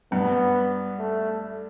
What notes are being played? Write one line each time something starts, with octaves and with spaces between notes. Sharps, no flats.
G2 B3
A3